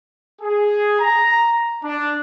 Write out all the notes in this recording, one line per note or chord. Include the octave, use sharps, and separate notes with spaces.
G#4
A#5
D4